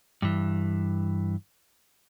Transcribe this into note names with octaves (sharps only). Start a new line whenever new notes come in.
G2 E3